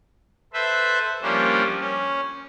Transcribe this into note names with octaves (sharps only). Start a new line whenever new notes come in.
A4 B4 C5 E5
F3 G3 A#3 C#4 D4
C#4